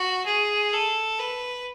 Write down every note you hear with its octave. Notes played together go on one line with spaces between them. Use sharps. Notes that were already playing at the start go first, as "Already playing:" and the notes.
Already playing: F#4
G#4
A4
B4